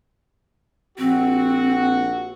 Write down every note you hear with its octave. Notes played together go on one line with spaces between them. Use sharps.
A#1 C4 F#4